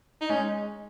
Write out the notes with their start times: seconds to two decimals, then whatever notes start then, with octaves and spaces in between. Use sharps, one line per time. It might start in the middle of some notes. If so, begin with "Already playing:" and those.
0.21 D#4
0.29 G#3 C#4